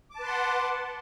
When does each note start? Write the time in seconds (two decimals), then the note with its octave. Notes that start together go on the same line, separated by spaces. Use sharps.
0.11 D6
0.15 A5
0.19 B4
0.24 C6
0.28 F#5